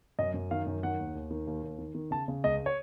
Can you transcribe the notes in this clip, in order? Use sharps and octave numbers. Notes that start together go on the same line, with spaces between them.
F#2 D#5
F#2
D#3 F5
F#2
D#3 F#5
D#2
D#2
D#3
D#2
D#2
D#3
D#3
C#3 A5
C#3
C#2 D#5
C#5